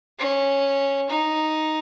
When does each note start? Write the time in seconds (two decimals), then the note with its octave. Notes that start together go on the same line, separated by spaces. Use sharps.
0.19 C#4
1.09 D#4